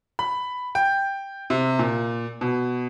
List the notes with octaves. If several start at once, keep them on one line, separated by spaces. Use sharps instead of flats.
B5
G5
C3
A#2
B2